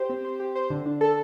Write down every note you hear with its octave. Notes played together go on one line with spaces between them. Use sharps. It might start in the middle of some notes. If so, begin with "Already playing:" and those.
Already playing: G4 C5
C4
C5
G4
C5
D3
D4
A4